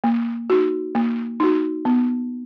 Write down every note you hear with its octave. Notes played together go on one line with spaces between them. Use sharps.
A#3
D#4 F#4
A#3
D#4 F#4
B3